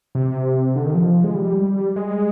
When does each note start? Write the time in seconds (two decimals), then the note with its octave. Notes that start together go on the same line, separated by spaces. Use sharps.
0.15 C3
0.76 D3
0.86 D#3
0.95 F3
1.24 G#3
1.35 G3
1.96 G#3